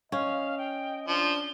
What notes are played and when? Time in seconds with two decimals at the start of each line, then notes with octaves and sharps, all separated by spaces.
0.12 C#4 D#5 F5
0.58 G5
1.08 F3 D4 G7